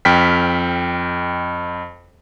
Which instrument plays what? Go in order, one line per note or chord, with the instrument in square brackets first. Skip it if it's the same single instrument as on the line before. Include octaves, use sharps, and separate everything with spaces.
[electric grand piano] F2 G5 F6 B6